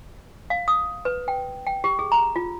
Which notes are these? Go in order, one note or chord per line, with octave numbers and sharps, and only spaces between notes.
F5
D#6
B4
G5
G5
G4
G#4
A#5
F4